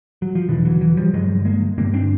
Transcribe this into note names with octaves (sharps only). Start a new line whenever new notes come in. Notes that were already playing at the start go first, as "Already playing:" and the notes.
F#3
F3
E2 B2 D3 E3
E3 F#3
E3 F#3
F3 G3
G2 D3 F#3 G#3
G#3 A#3
G2 D3 A#3 C4
C4 D4